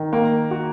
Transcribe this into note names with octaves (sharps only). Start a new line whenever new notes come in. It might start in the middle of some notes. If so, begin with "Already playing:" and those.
Already playing: D#3
A#3
F#4